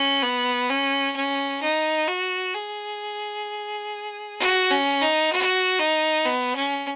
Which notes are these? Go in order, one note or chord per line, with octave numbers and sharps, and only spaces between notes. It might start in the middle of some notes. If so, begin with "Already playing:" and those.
Already playing: C#4
B3
C#4
C#4
D#4
F#4
G#4
F#4
C#4
D#4
F#4
D#4
B3
C#4